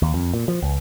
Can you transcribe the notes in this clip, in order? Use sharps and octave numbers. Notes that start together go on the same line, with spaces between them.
D#2
F2
A#2
F3
C#2